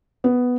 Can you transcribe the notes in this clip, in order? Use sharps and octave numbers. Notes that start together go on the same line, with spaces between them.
B3